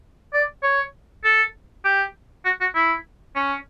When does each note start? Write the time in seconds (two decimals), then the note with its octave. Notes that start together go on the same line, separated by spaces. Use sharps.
0.34 D5
0.63 C#5
1.24 A4
1.85 G4
2.45 F#4
2.61 F#4
2.75 E4
3.36 C#4